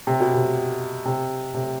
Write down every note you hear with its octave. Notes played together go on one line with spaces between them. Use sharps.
C3
B2
C3
C3
C3